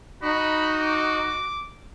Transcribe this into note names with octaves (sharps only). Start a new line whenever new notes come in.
D#4 F#4 B5
D6